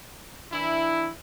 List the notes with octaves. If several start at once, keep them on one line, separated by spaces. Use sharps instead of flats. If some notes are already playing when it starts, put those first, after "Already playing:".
E3 D4 E4